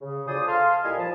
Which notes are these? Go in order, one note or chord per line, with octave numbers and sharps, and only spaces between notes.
C#3
D2 F3 C5 D5 G#5 D#6
A4 F5 A5 C6
A#2 G3 E4 D#5 G#5
F3 A5